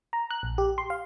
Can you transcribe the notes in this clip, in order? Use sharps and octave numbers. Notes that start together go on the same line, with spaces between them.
A#5
F#6
A#1
G4
C6
F5